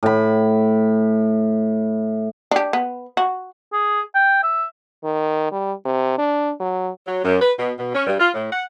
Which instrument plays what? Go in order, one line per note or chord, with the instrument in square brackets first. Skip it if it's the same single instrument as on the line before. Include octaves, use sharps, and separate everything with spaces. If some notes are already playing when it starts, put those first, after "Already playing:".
[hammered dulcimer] A2 B5
[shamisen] D4 G4
B3
F#4
[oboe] G#4
G5
E5
[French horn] D#3
G3
C3
D4
F#3
[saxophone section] F#3
F#2
B4
B2
B2
C#4
G2
F4
A2
F#5